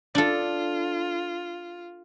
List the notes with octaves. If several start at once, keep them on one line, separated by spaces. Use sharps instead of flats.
D4 F4 A4